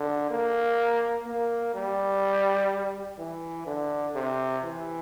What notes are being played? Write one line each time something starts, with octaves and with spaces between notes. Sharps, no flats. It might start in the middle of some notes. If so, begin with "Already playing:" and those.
Already playing: D3
A#3
A#3
G3
E3
D3
C3
E3